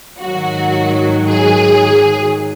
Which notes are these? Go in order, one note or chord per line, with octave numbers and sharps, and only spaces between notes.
G#2 D#3 F#3 F#4
G#4